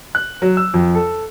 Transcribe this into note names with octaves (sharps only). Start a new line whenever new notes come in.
F#6
F#3
E6
F2
A4